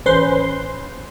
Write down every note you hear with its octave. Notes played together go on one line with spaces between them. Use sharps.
A1 C#4 B4 C5 C6